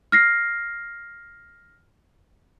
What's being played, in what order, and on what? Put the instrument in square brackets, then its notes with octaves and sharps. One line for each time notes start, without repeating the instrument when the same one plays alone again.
[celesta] F6 A#6 C7